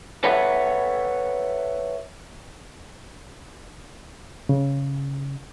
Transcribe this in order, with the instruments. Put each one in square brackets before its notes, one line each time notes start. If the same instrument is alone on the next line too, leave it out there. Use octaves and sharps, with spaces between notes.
[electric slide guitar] A4 B4 C#5 E5 F#5
[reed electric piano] C#3